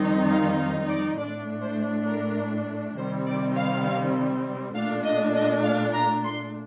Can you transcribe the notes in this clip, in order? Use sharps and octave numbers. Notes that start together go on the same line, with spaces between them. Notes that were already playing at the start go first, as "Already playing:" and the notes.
Already playing: F2 D#3 G3 C4 D#4
F5
F5
D5
A2 A3 D4 D5
C5
A#4
C3 D#3 G3 C4 C5
D5
F5
A#2 A3 D4 F5
D#5
D#5
F5
A#5
C6